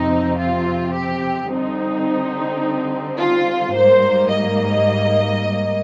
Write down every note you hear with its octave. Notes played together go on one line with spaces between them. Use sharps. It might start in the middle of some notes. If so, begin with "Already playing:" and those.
Already playing: F2 C3 F3 C4 D#4
F4
G4
D3 G3 C4 D#4
F4
G#2 G3 A#3 C5
D#5